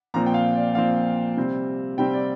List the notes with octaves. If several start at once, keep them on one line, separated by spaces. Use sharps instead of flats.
A#2 F3 C4 A#5
G5
F5
D5
A#2 F3 C4 F5
C3 G3 C4
C3 G3 C4 G5
D5